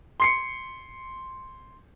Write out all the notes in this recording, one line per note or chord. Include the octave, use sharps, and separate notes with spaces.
C6 C7 C#7